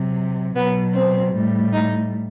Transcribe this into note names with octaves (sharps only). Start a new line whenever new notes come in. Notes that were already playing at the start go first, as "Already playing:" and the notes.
Already playing: C3 F#3
B2 F#3 B3
C4
A2 G3
D#4